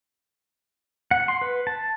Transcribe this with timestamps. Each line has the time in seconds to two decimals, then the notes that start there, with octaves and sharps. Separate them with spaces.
1.11 F#5
1.28 C6
1.41 B4
1.67 A5